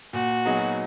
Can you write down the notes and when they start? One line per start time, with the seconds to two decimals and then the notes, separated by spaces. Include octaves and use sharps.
0.13 A#2 F#4
0.45 F#3 B3 D#4 G#4